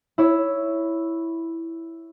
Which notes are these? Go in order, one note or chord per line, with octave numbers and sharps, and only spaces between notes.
E4 C#5